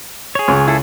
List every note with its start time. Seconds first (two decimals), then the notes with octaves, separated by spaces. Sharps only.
0.35 G#4 C#5
0.48 C#2
0.68 E4 G#4 A4